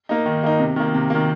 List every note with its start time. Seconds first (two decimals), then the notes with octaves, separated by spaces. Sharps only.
0.09 A#3 D#4
0.26 D#3
0.43 A#3 D#4
0.60 C3
0.76 D#3 A#3
0.94 C3
1.10 D#3 A#3